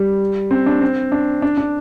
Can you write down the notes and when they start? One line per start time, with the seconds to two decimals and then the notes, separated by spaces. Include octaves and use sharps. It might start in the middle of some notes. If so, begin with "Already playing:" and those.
Already playing: G3
0.51 C4
0.66 D4
0.81 C4
1.12 D4
1.42 D4
1.57 D4